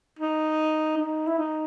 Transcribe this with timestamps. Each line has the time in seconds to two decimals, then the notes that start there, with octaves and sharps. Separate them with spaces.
0.19 D#4
0.98 D#4
1.27 E4
1.38 D#4